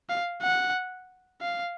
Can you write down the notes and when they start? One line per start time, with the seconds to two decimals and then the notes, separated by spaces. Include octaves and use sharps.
0.10 F5
0.42 F#5
1.42 F5